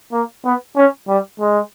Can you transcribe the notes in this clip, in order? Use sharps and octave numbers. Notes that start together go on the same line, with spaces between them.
A#3
B3
C#4
G3
G#3